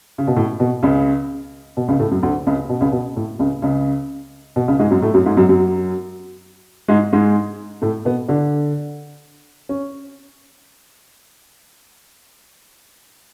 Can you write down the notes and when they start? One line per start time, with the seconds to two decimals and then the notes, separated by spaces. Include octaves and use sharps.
0.18 C#3
0.27 B2
0.36 A2
0.60 B2
0.83 C#2 C#3
1.77 B2
1.88 C#2 C#3
1.99 A2 A3
2.11 F#2 F#3
2.23 D2 D3
2.47 C#2 C#3
2.69 B2
2.81 C#2 C#3
2.92 B2
3.16 A2
3.39 C#2 C#3
3.62 C#2 C#3
4.56 B2
4.68 C#2 C#3
4.79 G#2 G#3
4.90 F#2 F#3
5.02 A2 A3
5.14 F#2 F#3
5.26 G#2 G#3
5.37 F#2 F#3
5.49 F#2 F#3
6.88 G#2 G#3
7.13 G#2 G#3
7.82 A2 A3
8.05 B2 B3
8.28 D3 D4
9.69 C#4